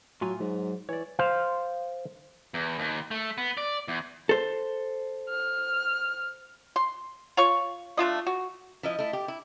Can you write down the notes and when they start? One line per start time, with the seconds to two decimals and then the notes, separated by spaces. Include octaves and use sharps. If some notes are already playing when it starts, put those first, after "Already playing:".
0.21 A2 F#3 F4 G#5
0.40 G#2 F#3
0.89 E3 C#5 D5
1.19 C5 F5
2.54 E2
2.79 D#2
3.11 A3
3.38 B3
3.57 D5
3.88 E2
4.29 A4 C5
5.29 F6
6.76 C6
7.37 F4 C#5 C#6
7.97 A3 D4 F4 D#5
8.27 F#4
8.83 F3 E4 D#5
8.99 A3 E4
9.13 G4
9.28 E4